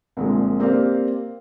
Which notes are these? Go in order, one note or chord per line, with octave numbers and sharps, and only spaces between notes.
C2 A#2 D3 F3 G#3
A#3 C4 G4 D5 F5